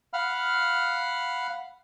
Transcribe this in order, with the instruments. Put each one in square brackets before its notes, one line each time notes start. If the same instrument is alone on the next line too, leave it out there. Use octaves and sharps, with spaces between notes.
[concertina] F5 F#5 B5 F6